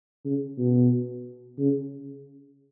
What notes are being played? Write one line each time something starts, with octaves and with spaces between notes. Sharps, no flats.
C#3
B2
C#3